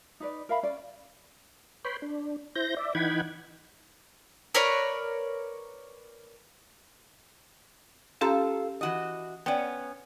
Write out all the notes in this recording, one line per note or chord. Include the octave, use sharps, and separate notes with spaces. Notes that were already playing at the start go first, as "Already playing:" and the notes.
D#4 B4 D5
A#4 E5 F5 B5
C#4 D5
B4 C#5 G5 B5 C6
D4
E4 C5 G6 A#6
D5 E5
E3 D#4 F#5 G5 B5 G#6
A#4 B4 C#5 D5
C#4 F4 G4 A4 F5 A#5
E3 F#4 D#5
B3 C#4 D5 G5